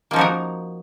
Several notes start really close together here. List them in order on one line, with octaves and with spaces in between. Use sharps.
A#3 F3 D#4 F#4 A#4